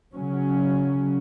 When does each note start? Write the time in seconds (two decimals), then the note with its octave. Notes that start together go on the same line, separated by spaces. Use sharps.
0.14 C#3 F#3 C#4